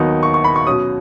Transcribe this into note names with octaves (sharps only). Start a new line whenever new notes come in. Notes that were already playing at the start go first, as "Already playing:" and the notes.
Already playing: D#2 D#3 F#3 B3 D#4
C#6
C#6
B5
C#6
B2 F#3 C#4 D#6